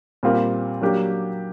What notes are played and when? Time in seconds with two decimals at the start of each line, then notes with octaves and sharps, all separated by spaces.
0.23 A#2 G3 C4 F4 A#4
0.81 F#3 A#3 D4 G4